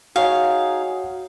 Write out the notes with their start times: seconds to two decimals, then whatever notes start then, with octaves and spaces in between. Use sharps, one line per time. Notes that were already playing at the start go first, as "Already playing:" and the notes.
0.16 D#4 F#4 G#4 C#5 F5 F#5